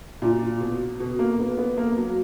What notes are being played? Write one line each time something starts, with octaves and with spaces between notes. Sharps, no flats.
A#2
B2
B2
A#3
B3
B3
A#3
F#3